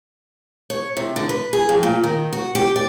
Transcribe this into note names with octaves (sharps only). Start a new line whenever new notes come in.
C#5
C3
D3
B4
G#4
F2
A#2
D#3
F#4
G4
D5